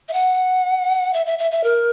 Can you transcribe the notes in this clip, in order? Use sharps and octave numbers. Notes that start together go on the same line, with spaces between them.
E5
F#5
E5
E5
E5
E5
A#4